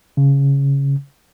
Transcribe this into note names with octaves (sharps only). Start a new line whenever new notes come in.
C#3